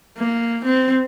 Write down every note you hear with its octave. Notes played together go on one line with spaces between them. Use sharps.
A#3
C4